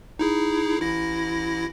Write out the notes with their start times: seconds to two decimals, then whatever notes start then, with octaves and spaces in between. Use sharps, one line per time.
0.19 D#4 E4 G#4
0.81 A1 E4 A#6